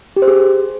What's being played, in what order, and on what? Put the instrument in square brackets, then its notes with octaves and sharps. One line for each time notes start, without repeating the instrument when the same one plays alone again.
[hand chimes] G4
C5
G#4